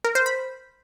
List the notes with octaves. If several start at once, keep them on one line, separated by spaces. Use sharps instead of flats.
A#4
C5
B5